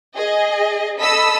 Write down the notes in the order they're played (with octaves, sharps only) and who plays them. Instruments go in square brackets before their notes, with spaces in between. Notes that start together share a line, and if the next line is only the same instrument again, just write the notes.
[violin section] G#4 D#5
A4 D#5 B5 D#6 E6 B6